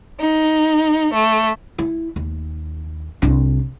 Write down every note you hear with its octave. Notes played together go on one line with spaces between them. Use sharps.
D#4
A3
E4
D#2
C2 D4